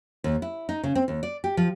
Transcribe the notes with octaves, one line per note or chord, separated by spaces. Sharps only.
D#2
E4
D#4
C#3
C4
D#2
D5
G4
F3